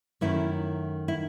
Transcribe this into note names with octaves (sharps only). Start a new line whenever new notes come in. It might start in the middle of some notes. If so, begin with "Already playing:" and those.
F#2 D#3 A3 C#4 E4
E4